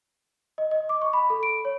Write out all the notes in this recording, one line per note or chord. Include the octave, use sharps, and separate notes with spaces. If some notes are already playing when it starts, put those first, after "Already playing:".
D#5
D#5
D6
C#6
B5
A4
D7
C#5